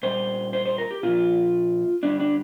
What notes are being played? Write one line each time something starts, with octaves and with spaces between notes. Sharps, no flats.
A#2 G3 C5
C5
C5
A#4
G4
A#2 F3 F4
G2 D3 G3 D4
D4